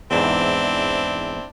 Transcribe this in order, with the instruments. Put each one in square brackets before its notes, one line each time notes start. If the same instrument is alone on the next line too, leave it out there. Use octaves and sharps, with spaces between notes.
[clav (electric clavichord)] E2 G#2 [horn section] C4 D4 E4